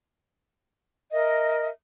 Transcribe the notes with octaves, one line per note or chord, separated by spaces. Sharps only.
A#4 D#5 E5